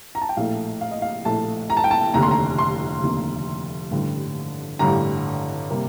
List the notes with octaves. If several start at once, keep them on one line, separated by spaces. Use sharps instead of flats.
A#5
A5
G5
A#1 A2 A3 F5
F5
D#5
F5
A#1 A2 A3 A5
A#5
A5
G5
A5
F1 D#2 D3 A#5
C6
A#5
C6
F1 D#2 D3
A1 G2 D3 G3
A1 G2 D3 G3 A#5
C3 G3 A#3